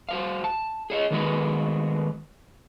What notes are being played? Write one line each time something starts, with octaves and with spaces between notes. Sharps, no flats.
F#4 C5 F5
A5
G#4 C#5 D#5
D#3 G#3 B3 F#4 G#4 B4